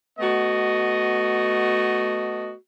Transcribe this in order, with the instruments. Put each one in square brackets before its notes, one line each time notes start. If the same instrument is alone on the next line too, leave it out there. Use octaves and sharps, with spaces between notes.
[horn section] A3 B3 F#4 D#5